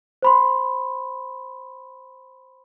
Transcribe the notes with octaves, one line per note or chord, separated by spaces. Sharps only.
C5 B5 C6